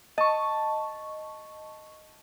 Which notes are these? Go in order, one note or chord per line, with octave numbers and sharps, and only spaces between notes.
D#5 A5 C#6